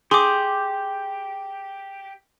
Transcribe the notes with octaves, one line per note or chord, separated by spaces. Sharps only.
G4 G#4 C6 D6